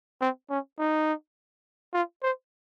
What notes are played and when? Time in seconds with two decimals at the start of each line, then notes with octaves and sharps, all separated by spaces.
0.21 C4
0.50 C#4
0.78 D#4
1.93 F4
2.23 C5